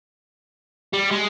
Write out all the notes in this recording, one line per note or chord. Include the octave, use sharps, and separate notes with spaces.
G3
G#3